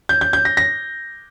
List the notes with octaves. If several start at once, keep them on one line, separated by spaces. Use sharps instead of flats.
G6
G6
G6
A#6
A#6